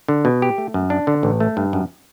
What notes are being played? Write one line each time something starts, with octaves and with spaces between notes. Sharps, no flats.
D3
B2
G4
A3
F#2
D4
D3
A1
A3
G2
F#2